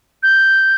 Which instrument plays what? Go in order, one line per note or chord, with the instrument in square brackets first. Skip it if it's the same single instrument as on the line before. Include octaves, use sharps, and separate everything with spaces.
[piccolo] G6